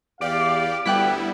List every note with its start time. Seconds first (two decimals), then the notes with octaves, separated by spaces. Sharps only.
0.21 E2 E3 G4 D5 F5 D6
0.86 D2 G3 B3 E4 G5 F#6 B6